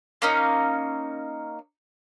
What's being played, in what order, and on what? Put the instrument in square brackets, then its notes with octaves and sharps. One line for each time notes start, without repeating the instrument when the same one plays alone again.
[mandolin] A#3 C#4 D#4